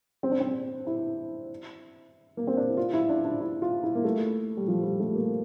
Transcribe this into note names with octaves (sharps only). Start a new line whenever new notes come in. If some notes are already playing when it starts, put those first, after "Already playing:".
C4
D4
C4
E4
A#3
C4
D4
E4
F4
E4
D4
D4
E4
F4
E4
A#3
A3
G3
F3
G3
A3
A#3